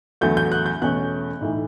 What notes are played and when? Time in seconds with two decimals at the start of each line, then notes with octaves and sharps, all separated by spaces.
0.21 E2 D3 F#3 A3 G6
0.37 G6
0.52 F#6
0.66 G6
0.82 E2 B2 A3 C#4 F#6
1.41 B1 A2 E3